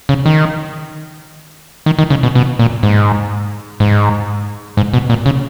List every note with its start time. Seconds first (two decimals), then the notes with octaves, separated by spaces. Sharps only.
0.09 C#3
0.26 D#3
1.86 D#3
1.99 D#3
2.10 C#3
2.23 B2
2.35 B2
2.59 A#2
2.83 G#2
3.80 G#2
4.77 G#2
4.93 B2
5.10 A#2
5.26 C#3